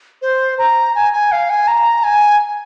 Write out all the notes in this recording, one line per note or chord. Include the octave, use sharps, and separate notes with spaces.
C5
A#5
G#5
G#5
F5
G#5
A#5
G#5